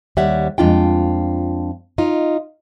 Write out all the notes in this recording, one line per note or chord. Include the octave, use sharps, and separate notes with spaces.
D#2 G3 C#5 E5 F#5
F2 G#3 D4 F4 F5 G5
D#4 F4